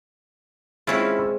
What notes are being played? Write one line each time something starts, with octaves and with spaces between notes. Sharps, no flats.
G#3 C4 C#4 E4 F4 C#5